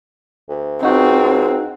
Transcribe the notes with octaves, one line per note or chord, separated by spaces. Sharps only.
D2
C#2 C4 D#4 F#4